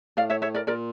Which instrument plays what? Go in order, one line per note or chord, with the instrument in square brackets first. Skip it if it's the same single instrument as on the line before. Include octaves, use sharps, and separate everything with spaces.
[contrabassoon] A2 [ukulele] D5 F5
[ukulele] C#5 E5
C#5 E5
A#4 D5
[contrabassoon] A#2 [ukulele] A#4 D5